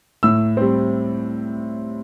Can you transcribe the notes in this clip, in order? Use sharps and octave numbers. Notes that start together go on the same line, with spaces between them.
A2 E6
G3 C4